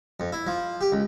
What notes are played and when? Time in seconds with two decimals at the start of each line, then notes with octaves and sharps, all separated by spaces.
0.20 F2
0.32 E4
0.47 F3
0.81 G4
0.92 C#2